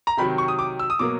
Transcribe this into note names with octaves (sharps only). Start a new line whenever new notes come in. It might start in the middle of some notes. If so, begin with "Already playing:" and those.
A#5
C3 D#3 F#3 B5
C#6
D#6
D6
E6
D#6
B2 F#3 A#3 D6